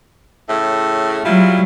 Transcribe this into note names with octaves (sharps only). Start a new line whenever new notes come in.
A2 C#3 A3
F#3 G3 E4 F4